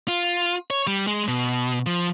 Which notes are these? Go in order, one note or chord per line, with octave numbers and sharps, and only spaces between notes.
F4
C#5
G3
G#3
B2
F3